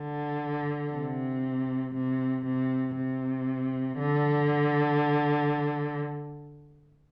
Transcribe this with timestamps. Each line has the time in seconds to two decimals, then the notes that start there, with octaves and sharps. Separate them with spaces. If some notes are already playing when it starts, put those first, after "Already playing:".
Already playing: D3
0.93 C3
1.95 C3
2.45 C3
2.96 C3
3.99 D3